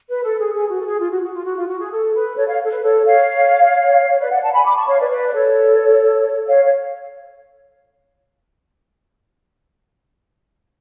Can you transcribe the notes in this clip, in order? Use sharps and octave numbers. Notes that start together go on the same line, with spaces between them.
B4
A4
G#4
G#4
F#4
A4
G#4
F4
F#4
F#4
F4
F#4
F4
F#4
G#4
A4
B4
A4 C#5
C#5 F5
A4
B4
A4 C#5
C#5 F5
C#5
B4 D5
D5 F#5
F#5 A5
G#5 B5
B5 D6
A5 C#6
C#5 F5
B4 D5
B4 D5
D5
A4 C#5
C#5 F5
C#5